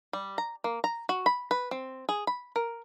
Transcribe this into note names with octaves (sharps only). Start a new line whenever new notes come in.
G3
A#5
A#3
A#5
F#4
B5
B4
C4
G#4
B5
A#4